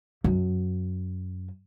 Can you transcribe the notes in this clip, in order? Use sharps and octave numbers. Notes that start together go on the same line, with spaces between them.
F#2